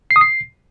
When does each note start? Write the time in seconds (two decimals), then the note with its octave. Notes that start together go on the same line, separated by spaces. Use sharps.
0.11 C7
0.16 D#6
0.21 C7